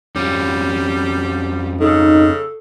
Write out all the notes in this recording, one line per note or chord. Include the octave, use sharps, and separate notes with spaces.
F2 G3 C#4
C#3 D#4 A4